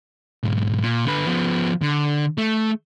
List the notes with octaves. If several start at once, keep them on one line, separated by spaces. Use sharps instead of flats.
B1 G#2
A#2
D3 B4
F3 B3
D3
A3